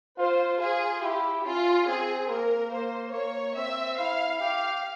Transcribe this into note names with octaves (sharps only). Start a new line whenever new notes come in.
F4 C5
F4 G#4
E4 G4
C#4 F4
C4 G#4
A#3 A#4
A#3 C5
A#3 C#5
C4 E5
E4 F5
G4 F5